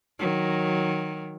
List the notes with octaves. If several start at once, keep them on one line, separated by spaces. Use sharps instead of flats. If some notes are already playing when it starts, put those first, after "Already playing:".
D#3 F#3